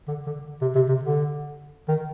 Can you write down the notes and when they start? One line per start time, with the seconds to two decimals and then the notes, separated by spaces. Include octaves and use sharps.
0.08 D3
0.26 D3
0.62 C3
0.75 C3
0.89 C3
1.03 D3
1.88 D#3